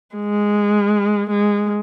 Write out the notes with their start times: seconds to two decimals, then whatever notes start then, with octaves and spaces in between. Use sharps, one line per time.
0.16 G#3
1.30 G#3